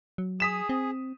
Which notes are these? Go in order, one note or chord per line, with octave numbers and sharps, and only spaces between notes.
F#3
G#4 D#6 B6 E7
C4